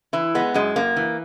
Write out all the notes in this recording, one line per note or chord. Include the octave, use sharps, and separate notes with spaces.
E3 E4
G#3 B3
F#2 G#3
F#2 A#3
E3